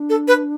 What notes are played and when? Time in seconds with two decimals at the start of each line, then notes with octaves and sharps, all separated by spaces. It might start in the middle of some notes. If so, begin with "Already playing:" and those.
Already playing: D4
0.10 A4
0.28 B4